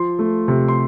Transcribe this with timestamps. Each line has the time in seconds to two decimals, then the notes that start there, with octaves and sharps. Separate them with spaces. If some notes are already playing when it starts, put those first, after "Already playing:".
Already playing: F3 C6
0.19 A3
0.48 C3
0.68 C6